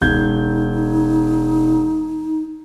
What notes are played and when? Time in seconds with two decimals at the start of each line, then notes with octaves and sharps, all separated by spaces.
0.01 E1 D#4 G6 G#6